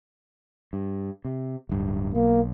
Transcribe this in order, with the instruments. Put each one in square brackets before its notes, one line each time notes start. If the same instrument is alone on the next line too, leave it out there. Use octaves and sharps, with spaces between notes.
[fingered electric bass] G2
C3
D1 G2
[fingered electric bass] B1 [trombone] A#3